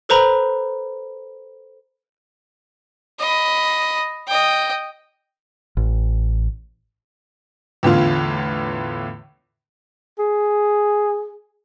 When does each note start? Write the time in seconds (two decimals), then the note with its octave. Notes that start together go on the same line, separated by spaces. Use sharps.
0.09 A4 B4 C5 A#5 B5
3.20 D#5 B5
4.28 D#5 G5
5.77 A1
7.83 E2 A2 D3 F4
10.19 G#4